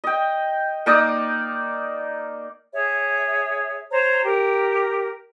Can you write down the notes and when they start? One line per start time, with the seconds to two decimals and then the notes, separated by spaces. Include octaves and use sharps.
0.04 D#5 G5
0.86 A#3 D#4 D5 D#6
2.74 G#4 C#5 E5
3.92 C5 C#5 A#5
4.24 G4 A#4